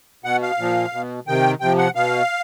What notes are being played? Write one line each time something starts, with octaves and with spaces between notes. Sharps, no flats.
B2 F#5
F5
A#2 F3
B2
C3 D#3 G5
C3 F3 G5
F#5
B2 F5